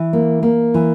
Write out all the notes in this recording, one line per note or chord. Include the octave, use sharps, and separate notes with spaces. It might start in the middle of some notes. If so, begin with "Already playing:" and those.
Already playing: E3
A#3
A#3
E3